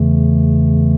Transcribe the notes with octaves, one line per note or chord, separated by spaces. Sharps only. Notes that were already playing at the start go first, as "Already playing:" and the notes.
Already playing: E2 C#3 E3 A3